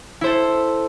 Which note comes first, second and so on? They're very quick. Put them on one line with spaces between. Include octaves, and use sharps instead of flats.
E4 C5 A4